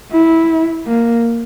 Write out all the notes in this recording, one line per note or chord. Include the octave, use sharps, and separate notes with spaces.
E4
A#3